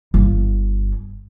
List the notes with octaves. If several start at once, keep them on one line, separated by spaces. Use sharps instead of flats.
G1